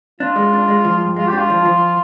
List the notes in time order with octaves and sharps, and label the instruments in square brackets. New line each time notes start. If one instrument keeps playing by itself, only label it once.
[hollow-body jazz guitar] D4 [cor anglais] F4
[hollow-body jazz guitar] G#3
D4
G#3
F3
G2
[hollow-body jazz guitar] G#3 [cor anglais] F4
[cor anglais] G4
[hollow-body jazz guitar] D4 [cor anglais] F4
[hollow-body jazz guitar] F3
F3